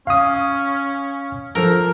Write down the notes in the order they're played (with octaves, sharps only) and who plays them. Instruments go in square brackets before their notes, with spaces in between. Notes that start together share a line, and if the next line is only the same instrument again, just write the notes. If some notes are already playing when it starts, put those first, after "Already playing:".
[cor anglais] C#4 [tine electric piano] F5 D#6
[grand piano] F3 A4 [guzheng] A#4